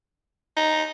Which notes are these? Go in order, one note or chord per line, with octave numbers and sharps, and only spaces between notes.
D#4